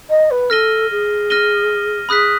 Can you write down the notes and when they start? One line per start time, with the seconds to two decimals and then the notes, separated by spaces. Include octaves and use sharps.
0.10 D#5
0.31 B4
0.50 A4 F6 A#6 D#7 G7
0.90 G#4
1.30 F6 A#6 D#7 G7
2.09 G#4 B5 D#6 F#6 B6